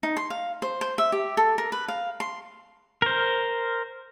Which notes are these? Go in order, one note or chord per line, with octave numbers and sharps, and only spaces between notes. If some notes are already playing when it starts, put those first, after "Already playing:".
D#4
C6
F5
C5
C5
E5
G4
A4
A#4
B4
F5
C6
A#4 C5